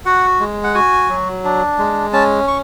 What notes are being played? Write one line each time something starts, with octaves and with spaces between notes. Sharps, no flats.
F#4 F#5
G#3
F#5
F#4 G#5
F#3
D4
G#3
C#4 A5
C#6